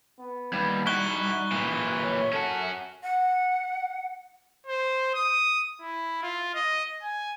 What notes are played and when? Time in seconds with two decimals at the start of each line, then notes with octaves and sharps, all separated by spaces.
0.19 B3
0.53 D#2 G3 B3
0.87 D#4 E4 F#4 C#6 F#6 G7
1.52 A#2 E3 E5 A#5
2.04 C#5
2.33 C#4 F#4 A4
3.03 F#5
4.67 C5
5.14 D#6
5.81 E4
6.23 F4
6.55 D#5
7.02 G#5